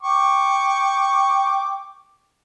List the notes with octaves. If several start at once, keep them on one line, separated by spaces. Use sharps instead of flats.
G5 C#6 D6